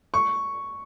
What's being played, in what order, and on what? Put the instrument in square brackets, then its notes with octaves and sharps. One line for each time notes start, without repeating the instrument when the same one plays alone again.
[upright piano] C#6